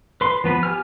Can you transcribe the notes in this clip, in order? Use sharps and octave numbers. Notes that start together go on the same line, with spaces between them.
B4 C6
F3 B3 B4
G4 G#5 F6